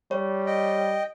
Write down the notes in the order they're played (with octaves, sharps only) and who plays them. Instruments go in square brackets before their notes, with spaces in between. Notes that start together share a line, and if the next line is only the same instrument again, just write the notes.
[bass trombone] G3 [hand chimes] C#5
[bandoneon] D#5 G5